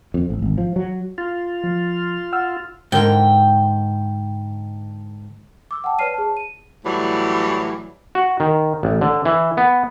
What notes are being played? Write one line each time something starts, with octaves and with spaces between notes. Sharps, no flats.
F2
A1
G#1
F3
F#3
F4
F3
F#5 E6 F6
G#2 D3 A#4 G5
D6 E6
F#5 G5 A5
B4 C#5 D5 F6 C7 D#7
G#4 A5
D#7
A2 E3 F#3 G3
F#4
D#3
A1
D3
E3
B3